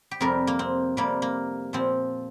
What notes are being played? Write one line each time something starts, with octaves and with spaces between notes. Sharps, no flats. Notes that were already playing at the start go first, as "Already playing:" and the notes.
G4
F2 C3 G3 A#4
A#3
C4
F2 C3 G3 A#3
A#3
A#2 F3 C4